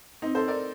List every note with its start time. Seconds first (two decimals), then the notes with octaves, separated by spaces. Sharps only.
0.22 C4 D#4
0.35 A4 C5
0.48 A#4 D5